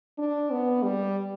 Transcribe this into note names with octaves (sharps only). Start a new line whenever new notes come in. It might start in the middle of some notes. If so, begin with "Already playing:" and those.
D4
B3
G3